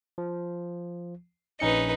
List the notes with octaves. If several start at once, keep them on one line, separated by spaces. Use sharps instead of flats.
F3
A#1 C#4 D#4 B4 C#7